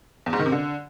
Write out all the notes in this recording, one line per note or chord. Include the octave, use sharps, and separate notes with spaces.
E2
G#2
D#3
C3
D3